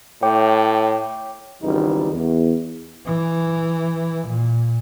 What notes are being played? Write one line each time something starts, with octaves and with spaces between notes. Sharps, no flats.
A2 C#5 G5 D6
G#1 C#2 E3 G3 D#4 B4
E2
E3
A#2